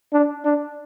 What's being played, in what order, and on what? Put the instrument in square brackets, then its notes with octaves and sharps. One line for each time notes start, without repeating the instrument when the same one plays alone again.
[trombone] D4
D4